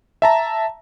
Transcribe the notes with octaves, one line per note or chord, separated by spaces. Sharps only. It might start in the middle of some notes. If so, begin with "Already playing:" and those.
E5 A5 A#5